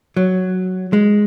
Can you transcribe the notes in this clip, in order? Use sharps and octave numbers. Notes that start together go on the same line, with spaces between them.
F#3
G#3